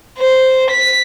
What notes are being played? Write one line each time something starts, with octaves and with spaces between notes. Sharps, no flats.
C5
B6